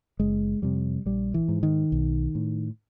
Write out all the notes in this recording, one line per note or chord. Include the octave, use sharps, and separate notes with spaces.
F#1 G#3
F2 C3 G3
A#1 G3
E3
G#2
D#3
B1
A2